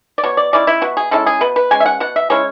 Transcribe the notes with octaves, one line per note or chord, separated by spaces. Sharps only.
D5
B2 C#5
D5
G#3 C#4 E4 D5
E4
B2 F#4
G#4
G#3 C#4 E4 A4
G#4
B2 B4
B4
G#3 C#4 G#5
E5
F#5
B2 F#5
E5
G#3 C#4 E4 C#5